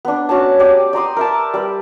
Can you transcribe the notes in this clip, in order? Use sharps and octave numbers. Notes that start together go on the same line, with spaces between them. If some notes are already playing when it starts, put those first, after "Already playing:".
B3 D4
C#4 F#4 C#5 A5
G4 D5 D#6
D5 A#5 C6 D#6
A#4 E5 A5
G3 B4